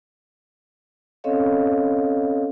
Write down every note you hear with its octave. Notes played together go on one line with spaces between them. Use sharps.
C4 C#4 A4 C#5 D#5 F5